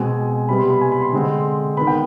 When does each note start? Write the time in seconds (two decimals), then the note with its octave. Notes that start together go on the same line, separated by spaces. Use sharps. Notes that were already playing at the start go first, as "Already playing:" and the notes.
Already playing: B2 G#3 C4 G#5
0.49 C3 G3 B3 B5
0.59 C6
0.70 B5
0.81 G#5
0.92 B5
1.02 C6
1.12 D3 G#3 C4
1.77 B3 B5
1.81 D#3
1.87 G5